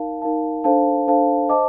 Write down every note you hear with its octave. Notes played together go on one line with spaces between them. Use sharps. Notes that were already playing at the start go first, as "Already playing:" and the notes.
Already playing: D#4 A#4 F5 A5
D#4 A#4 F5 A5
D4 A4 C5 F5 A5
D4 A4 C5 F5 A5
C5 D#5 A5 D6